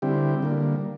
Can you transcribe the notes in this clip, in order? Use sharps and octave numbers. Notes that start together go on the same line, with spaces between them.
D3 G3 C4 E4 G4
D3 G3 A#3